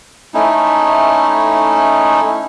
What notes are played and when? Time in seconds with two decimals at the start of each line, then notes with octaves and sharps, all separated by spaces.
0.34 A3 C#4 D#4 E4